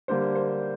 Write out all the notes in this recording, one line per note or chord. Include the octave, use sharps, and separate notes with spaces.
D3 G3 A#3 C5
C5